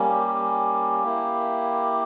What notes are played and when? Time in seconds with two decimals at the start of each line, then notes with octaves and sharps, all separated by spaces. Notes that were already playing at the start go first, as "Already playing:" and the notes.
Already playing: G3 A#3 C#4
0.09 G4
1.04 A#3 E4